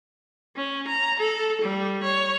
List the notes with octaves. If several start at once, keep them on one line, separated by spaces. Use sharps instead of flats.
C#4
A#5
A4
G3
C#5